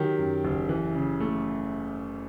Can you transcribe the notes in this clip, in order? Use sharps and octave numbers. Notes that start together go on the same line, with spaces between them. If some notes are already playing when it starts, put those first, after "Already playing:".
Already playing: D#3 F#3 G4
F#2
F#1
E3
C#3
A3